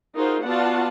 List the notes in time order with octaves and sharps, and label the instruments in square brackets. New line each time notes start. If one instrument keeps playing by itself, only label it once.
[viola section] D#4 F4 F#4 G#4 A#4 C5
B3 F4 F#4 D5 F#5 A5